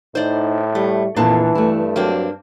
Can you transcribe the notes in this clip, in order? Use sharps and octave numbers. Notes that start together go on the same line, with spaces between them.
A2 D#4 C5 D5
G3 A3
F2 A#2 E3 B3 D4 A5
G2 A3 E4
F#3 A#3 C4 D4